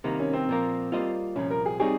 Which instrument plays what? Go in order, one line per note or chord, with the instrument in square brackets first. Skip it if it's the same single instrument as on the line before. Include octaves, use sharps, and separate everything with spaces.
[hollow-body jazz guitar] C2 C3 D#3 A#3 [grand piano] A#4
[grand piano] C#4
C4
[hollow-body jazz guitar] A#2 F3 A#3
G3 A#3 F4 C5 D#5
[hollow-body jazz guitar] C2 A#2 F3 [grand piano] C#4
[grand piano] A#4
G#4
[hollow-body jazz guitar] G3 C4 D#4 G4 C#5 [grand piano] G#4